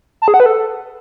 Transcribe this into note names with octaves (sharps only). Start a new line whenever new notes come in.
A5
G#4
F#5
B4
A4